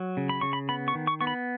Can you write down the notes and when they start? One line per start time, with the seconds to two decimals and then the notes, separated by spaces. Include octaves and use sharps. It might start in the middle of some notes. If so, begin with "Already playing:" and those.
Already playing: F#3
0.17 C#3
0.29 B5
0.41 C#3 C#6
0.53 B5
0.69 B3 B5
0.88 C#6
0.95 D#3
1.07 C#6
1.21 B3 C#6
1.27 B5